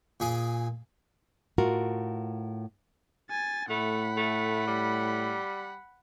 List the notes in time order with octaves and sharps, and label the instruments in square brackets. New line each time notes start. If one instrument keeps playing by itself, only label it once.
[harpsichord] A#2 G#4
[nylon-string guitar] A2 F4 F#4 A#4
[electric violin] G#5 A6
[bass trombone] A2 [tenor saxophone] A3 [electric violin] F#5 B5
[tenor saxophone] A3
G3